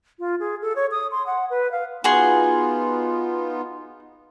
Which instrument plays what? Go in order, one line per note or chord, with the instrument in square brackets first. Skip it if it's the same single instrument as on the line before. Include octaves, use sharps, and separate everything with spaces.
[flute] F4
G#4
A4
C#5
D#6
C6
F#5
B4
F5
[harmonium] B3 D#4 F4 [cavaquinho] F#4 G#4 C6